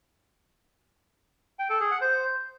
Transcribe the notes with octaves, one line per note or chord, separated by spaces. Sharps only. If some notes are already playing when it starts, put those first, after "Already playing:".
G5
A4
G#4
F#5
C5